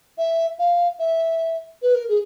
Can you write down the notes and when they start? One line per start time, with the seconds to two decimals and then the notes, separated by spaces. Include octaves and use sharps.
0.18 E5
0.59 F5
0.99 E5
1.82 B4
1.95 A#4
2.09 G#4